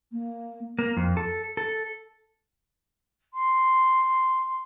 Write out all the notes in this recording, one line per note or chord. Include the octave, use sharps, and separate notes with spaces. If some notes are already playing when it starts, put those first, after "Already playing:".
A#3
A#3
F2
A4
A4
C6